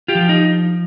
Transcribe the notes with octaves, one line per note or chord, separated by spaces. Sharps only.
F4 G4
F3
D#4